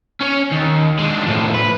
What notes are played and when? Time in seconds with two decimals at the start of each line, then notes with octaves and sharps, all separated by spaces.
0.20 C#4 C#5
0.51 D#2
0.99 G#3 D4
1.27 A2 F3
1.54 B4